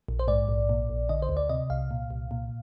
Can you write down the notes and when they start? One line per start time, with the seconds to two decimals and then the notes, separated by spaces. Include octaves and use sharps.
0.08 A#1
0.19 C5
0.28 G#2 D5
0.48 A#1
0.69 A#2
0.89 A#1
1.09 D3 D#5
1.22 C5
1.29 D2
1.37 D5
1.49 C3 D#5
1.70 C2 F5
1.91 A#2
2.10 C2
2.31 A#2